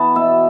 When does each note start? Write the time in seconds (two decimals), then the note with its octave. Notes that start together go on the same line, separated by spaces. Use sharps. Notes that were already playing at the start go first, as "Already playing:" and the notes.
Already playing: E3 B3 A5 B5
0.15 B2 E5